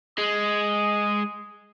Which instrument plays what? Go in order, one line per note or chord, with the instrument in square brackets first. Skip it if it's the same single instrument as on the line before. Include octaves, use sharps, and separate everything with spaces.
[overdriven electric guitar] G#3 [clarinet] D#6